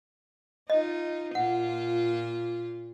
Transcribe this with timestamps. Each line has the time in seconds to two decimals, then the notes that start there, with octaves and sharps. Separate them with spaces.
0.70 D#4 F4 D#5
1.35 A#2 F4 F#5